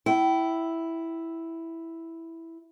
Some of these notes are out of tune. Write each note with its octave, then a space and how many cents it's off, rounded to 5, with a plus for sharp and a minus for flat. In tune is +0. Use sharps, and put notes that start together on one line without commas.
E4 +0 G5 -30